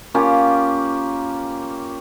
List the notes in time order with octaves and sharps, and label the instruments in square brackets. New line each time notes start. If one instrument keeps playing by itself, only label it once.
[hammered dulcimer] A#3 C#4 F4 G4